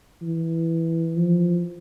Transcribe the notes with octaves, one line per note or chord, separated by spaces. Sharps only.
E3
F3